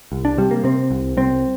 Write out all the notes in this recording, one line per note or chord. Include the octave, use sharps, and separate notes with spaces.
C2
D4
C3 G3
A#3
C3 C4
C2
C2 C4